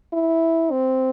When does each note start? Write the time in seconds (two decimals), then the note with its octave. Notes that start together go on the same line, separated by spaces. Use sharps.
0.13 E4
0.71 C4